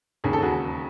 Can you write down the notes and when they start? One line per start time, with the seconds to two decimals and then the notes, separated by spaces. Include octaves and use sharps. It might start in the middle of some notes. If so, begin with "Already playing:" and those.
0.24 E1 D#2 C#3 G#4
0.33 A4
0.42 F#4 G#4